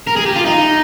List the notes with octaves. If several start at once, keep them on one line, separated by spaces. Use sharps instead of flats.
A#4
G#4
G4
F4
D#4